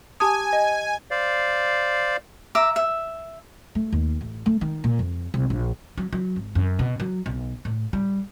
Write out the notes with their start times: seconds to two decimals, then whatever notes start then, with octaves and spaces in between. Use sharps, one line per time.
0.20 G4 G#5 A5 D#6
0.53 D#5
1.11 C5 D5 F5
2.55 E5 A#5 D6
2.76 E5
3.75 A3
3.92 D#2
4.21 A1
4.46 A3
4.61 D#3
4.84 A#2
4.99 F2
5.34 C2
5.50 A#1
5.98 F#3
6.13 F#3
6.36 G#1
6.55 F#2
6.79 B2
7.00 F#3
7.26 B1
7.65 A2
7.93 G3